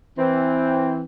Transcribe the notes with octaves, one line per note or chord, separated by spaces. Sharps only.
E3 C4